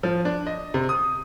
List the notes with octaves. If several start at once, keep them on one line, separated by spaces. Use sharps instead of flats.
F3
D4
D#5
C3
D#6